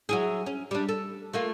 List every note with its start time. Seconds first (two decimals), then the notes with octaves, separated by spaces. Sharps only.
0.09 F#3 E4 G#4
0.46 C#4
0.71 G3 D4
0.89 A4
1.33 A3 A#3 F4